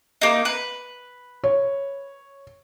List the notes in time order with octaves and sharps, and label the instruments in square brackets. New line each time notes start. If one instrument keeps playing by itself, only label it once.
[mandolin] A#3 D#4
B4
[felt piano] C#5